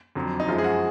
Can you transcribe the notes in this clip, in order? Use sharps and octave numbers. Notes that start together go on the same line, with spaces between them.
F2 D3 F#3
D#4
F#2 F3 G#3 F4
G#4
F#4